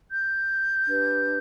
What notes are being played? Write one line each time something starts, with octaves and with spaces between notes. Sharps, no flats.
G6
D4 G4 B4